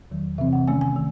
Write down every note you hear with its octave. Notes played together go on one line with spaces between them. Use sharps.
E2 D#3 F#3
C3 E3 C4 E5
F#5
C3 D#3 A3 C#4 G#5
G#5
D#3